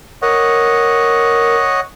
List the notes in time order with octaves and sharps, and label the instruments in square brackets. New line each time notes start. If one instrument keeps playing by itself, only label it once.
[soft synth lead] A#4 [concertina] C#5 D#5 F#5